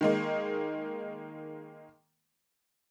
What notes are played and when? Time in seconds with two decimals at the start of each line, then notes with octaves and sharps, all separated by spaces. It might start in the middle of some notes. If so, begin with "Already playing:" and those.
0.01 D#3 G#3 A#3